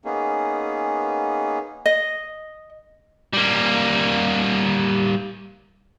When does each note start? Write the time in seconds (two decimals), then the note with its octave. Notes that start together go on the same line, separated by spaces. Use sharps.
0.05 A#3 B3 C#4 D#4 G#4
1.86 D#5
3.33 G3 A#3